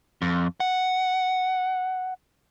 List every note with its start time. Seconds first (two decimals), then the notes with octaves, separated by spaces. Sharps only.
0.22 F2
0.60 F#5